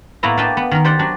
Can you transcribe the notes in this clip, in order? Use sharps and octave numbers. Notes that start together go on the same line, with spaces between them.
A2 A#3 B3 E4 A#5
A#3 D4 B4 D#5 G5 A5
B3
D#3 A#4
G4 C5 D5 F#5 G5
F#3 D4